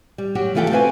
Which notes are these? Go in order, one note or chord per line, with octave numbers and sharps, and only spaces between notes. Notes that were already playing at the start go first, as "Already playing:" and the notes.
G3
F#3 F#4 G4
D2 E3 A3 F4 A4 G5
C4 F#4 B4 F5 G#5